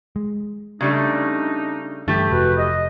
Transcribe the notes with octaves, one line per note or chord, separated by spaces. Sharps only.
G#3
C#3 G3 A3 D4 D#4
G2 D3 E3 A3 G4
F1 F#4 B4
D#5